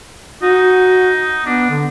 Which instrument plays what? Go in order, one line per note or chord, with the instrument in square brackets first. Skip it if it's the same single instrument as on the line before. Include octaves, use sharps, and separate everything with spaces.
[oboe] D#4 [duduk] F#4
[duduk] B3 [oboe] D4
[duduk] D3